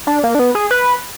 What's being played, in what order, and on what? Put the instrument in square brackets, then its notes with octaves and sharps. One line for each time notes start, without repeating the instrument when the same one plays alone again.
[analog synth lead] D4
A#3
D4
B3
G#4
B4